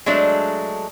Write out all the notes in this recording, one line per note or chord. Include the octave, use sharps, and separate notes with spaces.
F#3 G#3 A3 D4